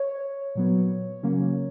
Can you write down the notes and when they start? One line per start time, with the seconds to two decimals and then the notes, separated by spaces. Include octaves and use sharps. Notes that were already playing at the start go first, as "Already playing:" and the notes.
Already playing: C#5
0.55 A#2 F#3 B3
1.23 C#3 F#3 A#3 C#4